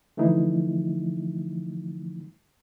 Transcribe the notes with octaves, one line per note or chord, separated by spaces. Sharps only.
D3 E3 F3 A3 D#4 E4